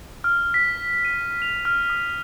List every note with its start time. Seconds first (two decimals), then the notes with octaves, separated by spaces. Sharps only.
0.24 F6
0.54 B6
1.05 D#7
1.42 F7
1.65 F6
1.90 D#6